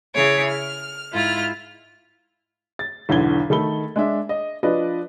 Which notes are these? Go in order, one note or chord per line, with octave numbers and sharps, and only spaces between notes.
C#3 E4 G#4 C#5 D6
F6
G#2 E4 F4 F6
A6
B1 E2 D3 G#6 G7
D#3 A3 A4 B5 G7
G#3 D4 E5
D#5
F3 D4 B4 D5 D#5